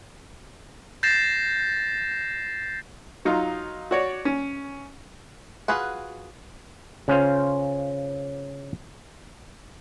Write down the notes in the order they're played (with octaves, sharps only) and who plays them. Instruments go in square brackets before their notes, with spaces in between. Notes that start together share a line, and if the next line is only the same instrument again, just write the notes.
[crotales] G6 A6 A#6 C7 E7
[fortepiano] F#3 D#4 F4
F#4 C#5 D5
C#4
[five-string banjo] F4 F#4 G#4 B4 F#5
[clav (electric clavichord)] C#3 C#4 F4 C5